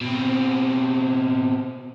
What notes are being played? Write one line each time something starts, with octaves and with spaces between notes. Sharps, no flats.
B2 C4